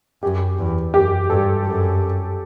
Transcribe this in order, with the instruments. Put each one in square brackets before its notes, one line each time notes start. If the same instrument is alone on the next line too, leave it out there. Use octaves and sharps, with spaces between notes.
[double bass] F#2 [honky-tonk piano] G4
[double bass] E2
[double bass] F#2 [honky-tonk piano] G4
[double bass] G2 [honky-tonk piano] A4
[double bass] F#2